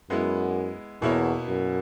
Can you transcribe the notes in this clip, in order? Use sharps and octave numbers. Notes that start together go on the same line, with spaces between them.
F#2 G#3 B3 E4
E2 B2 A#3 E4 A#4 C#5
F#2